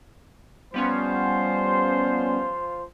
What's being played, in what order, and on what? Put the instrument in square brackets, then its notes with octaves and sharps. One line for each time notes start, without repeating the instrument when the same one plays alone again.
[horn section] F3 F4 C5 [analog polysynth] G3 B3 C#4